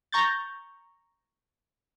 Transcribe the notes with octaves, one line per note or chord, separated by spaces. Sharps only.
A#5 C#6 G6 A6